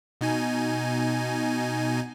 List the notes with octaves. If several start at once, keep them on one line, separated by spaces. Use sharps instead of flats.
B2 D#4 G#5